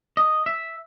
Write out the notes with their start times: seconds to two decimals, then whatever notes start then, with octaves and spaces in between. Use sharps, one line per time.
0.17 D#5
0.46 E5